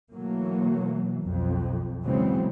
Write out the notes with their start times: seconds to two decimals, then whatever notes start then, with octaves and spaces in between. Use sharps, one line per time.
0.12 B2 E3 F#3 A3 A#3
1.22 B1 F2
2.03 C#3 E3 F#3 G#3 B3 C4